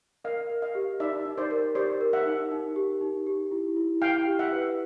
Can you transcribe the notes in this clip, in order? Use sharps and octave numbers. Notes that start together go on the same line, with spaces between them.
A#4 D#5 F5
A#4
D#5 F5
G4
D#4 D5 E5
D#4
C5 D5
A#4
G4 C5 D5
A#4
E5 F#5
D#4
D#4
G4
D#4
G4
E4
E4
E4 F5 G5
G4
E5 F#5
B4